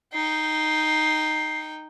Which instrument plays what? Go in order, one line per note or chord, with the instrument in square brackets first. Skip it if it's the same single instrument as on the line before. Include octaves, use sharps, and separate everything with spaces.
[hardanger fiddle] D#4 G5 [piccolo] C7